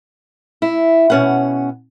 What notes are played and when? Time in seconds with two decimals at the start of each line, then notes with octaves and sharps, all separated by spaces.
0.62 E4
1.10 B2 C#4 F#5